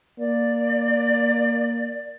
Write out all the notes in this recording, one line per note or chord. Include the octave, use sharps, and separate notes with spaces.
A#3 D5